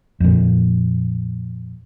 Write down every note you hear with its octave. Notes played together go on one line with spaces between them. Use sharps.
F2 A#2